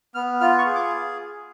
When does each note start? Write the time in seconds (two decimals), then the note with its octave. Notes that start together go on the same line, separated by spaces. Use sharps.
0.15 B3 F6
0.41 F4 F6
0.58 C#6
0.66 G#4
0.75 D6